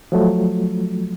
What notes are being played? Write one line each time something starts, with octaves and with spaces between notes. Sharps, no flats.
F3 F#3 A3